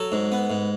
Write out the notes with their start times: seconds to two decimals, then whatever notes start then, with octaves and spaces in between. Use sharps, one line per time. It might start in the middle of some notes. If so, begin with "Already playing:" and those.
Already playing: F#3 A4
0.12 G#2
0.32 B3
0.50 G#2